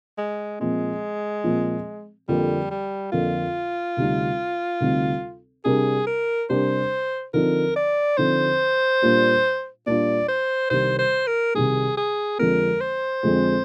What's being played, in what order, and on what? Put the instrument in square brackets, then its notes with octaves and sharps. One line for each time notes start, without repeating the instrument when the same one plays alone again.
[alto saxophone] G#3
[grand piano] A#2 F3 C4 [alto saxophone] G#3
[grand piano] A#2 F3 C4
[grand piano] F2 D3 F3 A#3 [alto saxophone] G3
[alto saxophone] G3
[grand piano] F2 D3 F3 A#3 [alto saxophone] F4
[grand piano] D2 C3 G3 C4 D#4
D2 C3 G3 C4 D#4
[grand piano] C3 G3 D4 G4 A#4 [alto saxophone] G#4
[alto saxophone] A#4
[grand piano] C3 G3 D4 G4 A#4 [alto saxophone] C5
[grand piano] D3 F3 C4 D#4 [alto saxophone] A#4
[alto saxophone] D5
[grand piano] D3 F3 C4 D#4 [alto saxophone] C5
[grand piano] A#2 G3 D4 F4
[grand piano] A#2 G3 D4 F4 [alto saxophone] D5
[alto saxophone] C5
[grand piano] C2 C3 D#3 G3 [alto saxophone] C5
[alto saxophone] C5
A#4
[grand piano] C2 C3 D#3 G3 [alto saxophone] G#4
[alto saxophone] G#4
[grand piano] F2 D3 F3 G#3 C4 [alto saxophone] A#4
[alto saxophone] C5
[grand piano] F2 D3 F3 G#3 C4